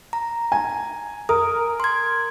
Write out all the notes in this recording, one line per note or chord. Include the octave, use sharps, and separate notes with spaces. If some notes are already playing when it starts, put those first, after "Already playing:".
A#5
G#5
A#4 D#6
C6 G#6